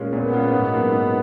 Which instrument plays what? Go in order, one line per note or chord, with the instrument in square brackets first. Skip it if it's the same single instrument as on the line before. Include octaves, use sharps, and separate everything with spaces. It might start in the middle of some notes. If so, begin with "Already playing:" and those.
Already playing: [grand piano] A#2 G#3 C#4 F4
[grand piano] A#2 [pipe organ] B3
[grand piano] G#3 C#4 F4
G#2
F#3 A#3
G#2